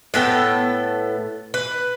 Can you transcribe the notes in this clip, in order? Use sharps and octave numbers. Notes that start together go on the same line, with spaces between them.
A2 B3 A4 G5
B4